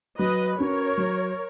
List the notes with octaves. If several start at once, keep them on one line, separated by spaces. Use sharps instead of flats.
F#3 B4 D#5
C#4 F#4 A#4 C#5
F#3